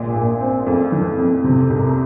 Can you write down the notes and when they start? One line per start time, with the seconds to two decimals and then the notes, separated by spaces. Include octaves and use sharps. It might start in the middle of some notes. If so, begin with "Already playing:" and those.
Already playing: A#1 A#2
0.14 A#2
0.41 C4
0.67 F2
0.92 E3
1.18 F2
1.44 C3
1.70 C2